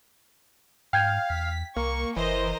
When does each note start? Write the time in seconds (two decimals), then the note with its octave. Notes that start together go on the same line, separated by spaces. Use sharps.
0.93 G#2 F5 G5 G6 G#6
1.30 E2 B6
1.76 C2 A#3 C#6
2.16 F#1 E3 A#4 C5 D#5